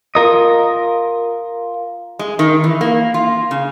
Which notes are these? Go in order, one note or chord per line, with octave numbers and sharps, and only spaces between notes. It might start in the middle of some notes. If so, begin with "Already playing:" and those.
F4 A#4 D#5
G#3
D#3
E3
A#3
F4
C#3